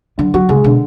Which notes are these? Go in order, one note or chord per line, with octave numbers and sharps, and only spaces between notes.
D3 F#3
F#3 F#4
C#3 G#3
B2 D3